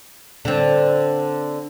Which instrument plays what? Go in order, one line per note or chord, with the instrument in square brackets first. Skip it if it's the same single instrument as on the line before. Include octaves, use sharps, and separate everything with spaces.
[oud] D3 C4